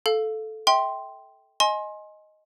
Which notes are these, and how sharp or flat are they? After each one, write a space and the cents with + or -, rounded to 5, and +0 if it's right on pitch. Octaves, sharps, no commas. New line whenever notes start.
A4 -10 F5 +0
E5 -30 G5 +0 C6 +0
D#5 +0 G#5 +15 C6 +25